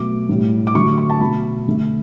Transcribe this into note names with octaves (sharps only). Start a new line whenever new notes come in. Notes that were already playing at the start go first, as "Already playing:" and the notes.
Already playing: B2 F#3 A3 D6
A2 G3
D6
D3 F#3 A3 C#6
C#6
A5
B2 F#3 A3 B5
D3 A3